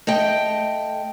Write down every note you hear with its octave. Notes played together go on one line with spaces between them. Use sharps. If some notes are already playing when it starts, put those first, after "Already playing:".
A3 D#5 G5